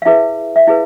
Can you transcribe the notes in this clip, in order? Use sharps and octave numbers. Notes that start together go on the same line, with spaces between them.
F5
E4 G#4 B4 E5
E5
E4 G#4 B4 F5